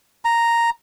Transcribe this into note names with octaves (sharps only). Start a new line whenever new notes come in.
A#5